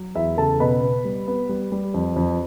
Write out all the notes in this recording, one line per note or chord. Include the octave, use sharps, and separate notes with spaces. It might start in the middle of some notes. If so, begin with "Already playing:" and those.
Already playing: F#3
E2 E4 E5
C#3 A4 A5
B2 B4 B5
B3
G3
B3
G3
G3
F2
F2